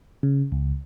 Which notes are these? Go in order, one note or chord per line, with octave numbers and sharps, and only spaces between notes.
C#3
C#2